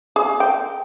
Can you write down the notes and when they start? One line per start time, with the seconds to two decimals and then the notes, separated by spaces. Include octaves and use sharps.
0.16 G#4
0.40 G5